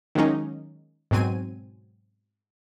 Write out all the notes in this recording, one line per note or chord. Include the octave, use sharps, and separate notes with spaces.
D#3 F#3 G#3 A#3 C#4 D#4
G#2 B2 F#3 C4 G#5 D#7